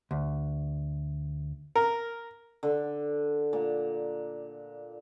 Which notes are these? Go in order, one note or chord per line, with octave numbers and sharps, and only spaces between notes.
D2
A#4
D3
A#2